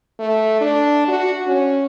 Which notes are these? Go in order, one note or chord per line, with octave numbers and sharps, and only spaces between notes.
A3
D4
F#4
C#4